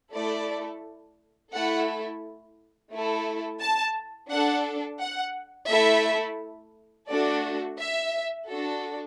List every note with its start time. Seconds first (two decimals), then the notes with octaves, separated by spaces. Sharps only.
0.14 A3 E4 A4 D5
1.53 A3 E4 A4 F#5
2.92 A3 E4 A4
3.61 A5
4.30 D4 A4 F#5
5.00 F#5
5.70 A3 E4 A4 E5
7.08 A3 D4 F#4 A4 D5
7.78 E5
8.47 D4 F#4 A4